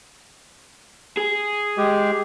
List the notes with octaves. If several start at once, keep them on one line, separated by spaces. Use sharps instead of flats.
G#4
G#3 G4